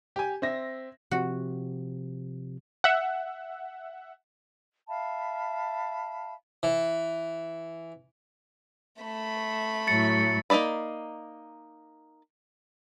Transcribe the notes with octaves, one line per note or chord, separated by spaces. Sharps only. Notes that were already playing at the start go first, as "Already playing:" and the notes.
G4 G#5
C4 E5 A#6
C3 F3 F#4
E5 F#5
E5 F5 A5 B5
E3
A3 B5
A2 F#3 A6 C#7
A#3 D#4 A4 D5 B5